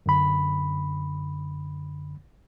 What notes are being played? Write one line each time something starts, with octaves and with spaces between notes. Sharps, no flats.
F#2 D3 B5